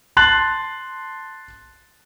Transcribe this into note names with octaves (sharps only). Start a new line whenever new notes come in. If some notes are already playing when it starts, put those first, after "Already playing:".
A5 C6 F#6 A6 F#7